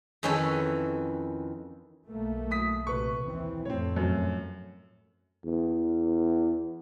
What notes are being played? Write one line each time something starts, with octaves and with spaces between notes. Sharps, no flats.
F2 D#3 E3 C#4 A4 B4
B1 A3 A#3
D#6 B6
A#1 C3 B4 C#6
D#2 E3 C4
F2 A2 A3 C4 C#5
F#2
E2